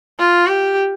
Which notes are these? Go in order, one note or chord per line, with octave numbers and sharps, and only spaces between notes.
F4
G4